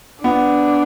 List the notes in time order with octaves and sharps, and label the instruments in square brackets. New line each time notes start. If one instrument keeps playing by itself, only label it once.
[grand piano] B3 [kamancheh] D4